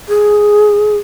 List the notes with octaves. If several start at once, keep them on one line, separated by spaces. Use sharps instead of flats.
G#4